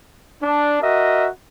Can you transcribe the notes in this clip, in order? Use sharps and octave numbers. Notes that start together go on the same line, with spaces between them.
D4
F#4 A#4 D#5 E5